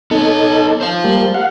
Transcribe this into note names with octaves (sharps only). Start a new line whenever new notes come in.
B3 D#4 A4 C#5
C5 F5
G3 A#3
F5 F#5